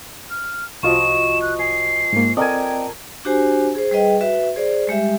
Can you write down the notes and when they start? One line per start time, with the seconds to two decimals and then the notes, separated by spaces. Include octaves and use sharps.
0.30 F6
0.83 C2 F3 F4 F#4 D#5 C#6 E7
1.42 F#6
1.59 G#5 C7
2.13 G#2 A#3
2.37 C4 A4 A#4 D5 D#5 G5 G#5
3.25 D4 F#4 G4 C5 G#5
3.75 G#4 C5
3.91 G3 G#4 B4 D#5 G5
4.21 F#4 B4 E5
4.56 G#4 C5 D5
4.88 G3 G#3 G4 E5